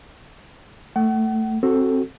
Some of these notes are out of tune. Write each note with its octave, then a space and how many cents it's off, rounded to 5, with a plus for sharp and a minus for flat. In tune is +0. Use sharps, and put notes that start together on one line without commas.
A3 +10 F#5 +40
C4 +15 F#4 +5 A4 +0